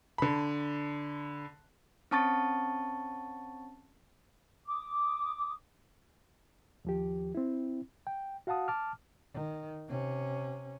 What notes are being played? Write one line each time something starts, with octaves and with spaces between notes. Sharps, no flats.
D3 B5
C4 C#4 A5 C#6 A6
D6 D#6
D#2 F3 G4
C4 E4
G5
F#4 F5 F#5 A5 D#6
A5 D6 F6
D#3
C3 C#4